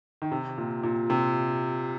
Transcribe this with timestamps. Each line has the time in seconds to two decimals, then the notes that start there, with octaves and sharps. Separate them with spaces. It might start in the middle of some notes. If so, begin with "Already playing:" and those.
0.22 D#3
0.32 C3
0.58 A#2
0.83 A#2
1.10 C3